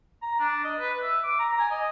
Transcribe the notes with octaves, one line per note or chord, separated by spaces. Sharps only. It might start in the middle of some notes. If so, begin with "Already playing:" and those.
A#5
D4
D#5
B4
E5
D6
A#5
G#5
D#5